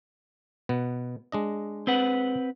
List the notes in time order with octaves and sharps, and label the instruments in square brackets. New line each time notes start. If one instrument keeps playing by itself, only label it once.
[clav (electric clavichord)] B2 B3
G#3 D4 D#5
[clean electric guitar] C4 B4 F#5